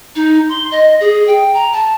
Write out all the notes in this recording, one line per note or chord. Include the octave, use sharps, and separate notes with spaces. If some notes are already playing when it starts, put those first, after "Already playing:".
D#4
C6
D#5
G#4
G5
A#5
A5